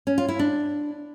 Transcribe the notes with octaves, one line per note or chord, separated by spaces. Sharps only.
C#4
F4
E4
D4